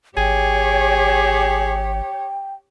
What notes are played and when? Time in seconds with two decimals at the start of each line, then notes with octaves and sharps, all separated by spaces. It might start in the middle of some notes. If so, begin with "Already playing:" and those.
0.17 G#1 G4 G#4 C#5 G5